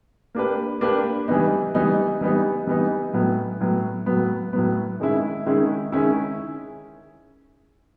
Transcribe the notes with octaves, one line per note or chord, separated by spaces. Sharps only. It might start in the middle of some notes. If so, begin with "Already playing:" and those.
A#3 D4 G4 B4
A#3 D4 G4 B4
E3 G3 B3 D#4
E3 G3 B3 D#4
E3 G3 B3 D#4
E3 G3 B3 D#4
A2 F#3 B3
A2 F#3 B3
A2 F#3 B3
A2 F#3 B3
D#3 G#3 C#4 E4
D#3 G#3 C#4 E4
D#3 G#3 C#4 E4